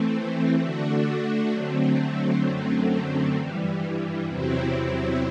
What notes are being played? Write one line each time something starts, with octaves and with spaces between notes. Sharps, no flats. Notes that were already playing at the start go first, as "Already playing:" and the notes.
Already playing: E3 A3 C4
D3 A3 D4 F#4
D3 F#3 A3 C4
F#2 D3 F#3 A3 C4
G2 E3 G3
E2 C3 F#3 C4 E4